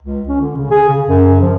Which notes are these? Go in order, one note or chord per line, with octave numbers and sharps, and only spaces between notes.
C#2
C#4
D3
C#3
G#4
C#3
F#2
F3